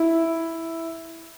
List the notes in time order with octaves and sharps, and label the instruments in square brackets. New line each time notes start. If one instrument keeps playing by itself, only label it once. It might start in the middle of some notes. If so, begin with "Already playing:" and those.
Already playing: [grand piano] E4